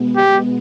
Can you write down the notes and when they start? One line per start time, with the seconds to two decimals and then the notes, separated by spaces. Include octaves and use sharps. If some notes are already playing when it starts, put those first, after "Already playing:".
Already playing: B2 G#3 B3
0.16 G4